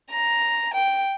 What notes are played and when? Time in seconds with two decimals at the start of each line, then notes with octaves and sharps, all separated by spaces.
0.11 A#5
0.74 G5